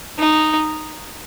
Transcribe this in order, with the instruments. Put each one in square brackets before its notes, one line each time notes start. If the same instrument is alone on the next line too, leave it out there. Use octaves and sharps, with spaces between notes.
[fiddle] D#4